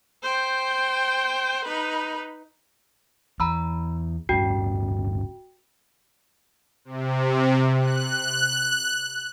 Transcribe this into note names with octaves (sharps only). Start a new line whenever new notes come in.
C5 G5
D#4 B4
E2 A#5 B5 E6
D1 G2 C#4 F#4 G5
C3
F#6